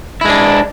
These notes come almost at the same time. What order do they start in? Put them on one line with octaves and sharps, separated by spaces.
E4 G#3 D4